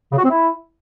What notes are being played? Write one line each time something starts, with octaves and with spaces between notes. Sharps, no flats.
C#3
F#4
C4
E4